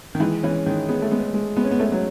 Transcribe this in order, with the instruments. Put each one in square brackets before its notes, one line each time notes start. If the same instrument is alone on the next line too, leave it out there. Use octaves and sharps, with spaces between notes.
[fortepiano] D#3
[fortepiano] E3 [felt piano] G#3
[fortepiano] E3 [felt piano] C#4
[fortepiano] D#3 [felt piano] G#3
[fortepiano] B3 [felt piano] G#4
[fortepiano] A3
[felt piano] G#3 [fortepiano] B3
[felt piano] G#3
[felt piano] G#3 [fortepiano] B3
[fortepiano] C#4
B3
[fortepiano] A3 [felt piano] C#4
[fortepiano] F#3